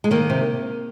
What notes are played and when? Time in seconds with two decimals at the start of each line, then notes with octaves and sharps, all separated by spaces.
0.04 G#3
0.11 D#3 A#3
0.30 C3